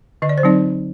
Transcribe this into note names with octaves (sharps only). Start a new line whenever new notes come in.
D3 D#5
D5
C5
F#3 C4 D#4 D5